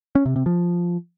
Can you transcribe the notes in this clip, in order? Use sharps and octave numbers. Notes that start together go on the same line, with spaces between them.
C#4
C3
C3
F3